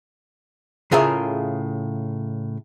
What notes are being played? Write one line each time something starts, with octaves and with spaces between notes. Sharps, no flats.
A2 C#3 F4 G#4 A#4 E5